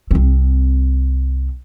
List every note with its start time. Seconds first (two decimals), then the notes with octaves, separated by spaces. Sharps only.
0.11 C2 C4